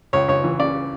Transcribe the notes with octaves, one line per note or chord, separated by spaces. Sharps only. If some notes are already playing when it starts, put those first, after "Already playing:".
C#2 C#5
C#2 C#5
E3
C#3 D5